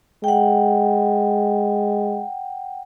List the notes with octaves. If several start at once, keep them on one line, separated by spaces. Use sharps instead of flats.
G#3 F#5 G5